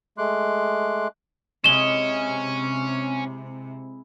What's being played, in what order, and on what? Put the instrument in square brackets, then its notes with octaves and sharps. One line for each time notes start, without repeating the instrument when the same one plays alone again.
[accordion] G#3 A3 C6 D6 F#6
[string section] C3 [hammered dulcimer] G#3 E4 [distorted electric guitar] C#4 [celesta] E7 G7